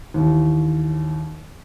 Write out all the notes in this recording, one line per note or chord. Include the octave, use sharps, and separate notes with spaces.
D#2 E3